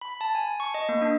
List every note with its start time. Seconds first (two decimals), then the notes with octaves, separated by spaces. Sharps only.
0.01 B5
0.21 A5
0.35 G#5
0.60 C#6
0.74 D#5
0.89 A#3
1.02 D4